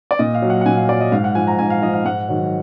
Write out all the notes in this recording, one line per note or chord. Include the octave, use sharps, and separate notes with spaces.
D5
A#2 D#5
F5
F#3
F#5
F#5
A#2 G#5
F5
F#3 D5
D#5
G#2 F5
F#5
F3 G#5
A#5
G#2 G#5
F5
F3 D#5
F5
G#2 F#5
D#3 F#3